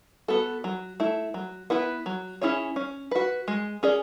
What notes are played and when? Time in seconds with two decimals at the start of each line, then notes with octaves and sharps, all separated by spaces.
0.28 B3 F#4 A4
0.64 F#3
1.00 A3 E4
1.34 F#3
1.70 B3 E4 B4
2.06 F#3
2.41 C#4 E4 G#4 C#5
2.76 C#4
3.11 F#4 B4
3.48 G#3
3.83 C#4 G#4 D5